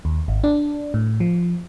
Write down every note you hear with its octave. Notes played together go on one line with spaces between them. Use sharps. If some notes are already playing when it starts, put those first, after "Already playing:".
D#2
G#1
D4
A2
F3